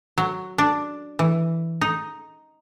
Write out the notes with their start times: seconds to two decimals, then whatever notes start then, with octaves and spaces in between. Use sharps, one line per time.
0.18 F#3
0.58 D4
1.19 E3
1.81 D#4